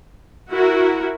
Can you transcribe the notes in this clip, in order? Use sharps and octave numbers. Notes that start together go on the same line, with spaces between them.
E4 F#4 A#4